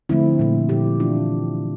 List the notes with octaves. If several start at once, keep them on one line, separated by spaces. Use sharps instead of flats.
D3 F3 A3 C4 E4
A#2 A3
A#2 F3 A3 E4 G4
E3 A3 D4 F4